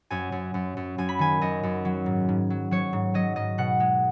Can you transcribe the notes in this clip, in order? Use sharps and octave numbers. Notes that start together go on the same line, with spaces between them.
F#2 G#5
F#2
F#2
F#2
F#2 G#5
B5
D#3 G#5
F#2 D#5
F#2
F#3
G#2
G#2
F#3
F#3 C#5
G#2
F#3 D#5
G#2 D#5
B2 F#5
G#3